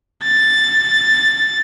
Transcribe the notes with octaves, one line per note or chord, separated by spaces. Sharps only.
A6